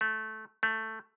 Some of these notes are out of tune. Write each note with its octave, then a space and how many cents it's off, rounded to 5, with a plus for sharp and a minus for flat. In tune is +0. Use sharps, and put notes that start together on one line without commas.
A3 -15
A3 +5